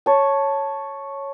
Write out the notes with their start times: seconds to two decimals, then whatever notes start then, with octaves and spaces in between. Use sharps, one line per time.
0.06 C#5 A5